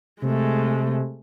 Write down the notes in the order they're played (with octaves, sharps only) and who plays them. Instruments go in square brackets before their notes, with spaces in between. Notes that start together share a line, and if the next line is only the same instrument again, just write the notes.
[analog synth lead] C3 [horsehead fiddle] G#3 A3